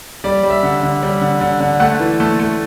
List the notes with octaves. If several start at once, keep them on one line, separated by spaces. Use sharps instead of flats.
G3 D5
G3
E5
D3
D3
G3
D3
D3
D3
A3 F#5
E3
A3
A3